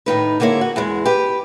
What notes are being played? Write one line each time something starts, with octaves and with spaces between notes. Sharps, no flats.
A2 D#3 D#4 B4
D3 G#3 A#3 E4 C#5
F#4
E2 E3 G#3
G4 B4